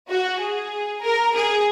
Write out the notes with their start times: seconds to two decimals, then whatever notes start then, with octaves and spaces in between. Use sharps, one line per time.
0.09 F#4
0.40 G#4
1.02 A#4
1.35 G#4